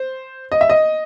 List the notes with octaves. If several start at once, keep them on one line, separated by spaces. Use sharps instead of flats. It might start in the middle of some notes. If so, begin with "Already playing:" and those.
Already playing: C5
D#5
E5
D#5